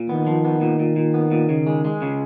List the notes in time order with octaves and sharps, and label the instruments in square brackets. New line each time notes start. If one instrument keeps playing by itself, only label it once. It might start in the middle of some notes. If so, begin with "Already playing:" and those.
Already playing: [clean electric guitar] A#2
[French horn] D#3 [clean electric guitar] B3
[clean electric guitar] F3
B3
A#2
A#2
A#2
B3
A#2
C#3
G#3
G#3
C#3